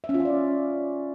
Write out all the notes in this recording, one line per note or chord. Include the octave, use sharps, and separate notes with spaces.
E5
C#4
F4
C#4
D5